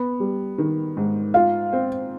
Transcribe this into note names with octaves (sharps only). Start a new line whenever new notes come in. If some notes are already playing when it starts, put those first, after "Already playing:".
Already playing: B3
G3
D#3
G#2
F4 F5
C4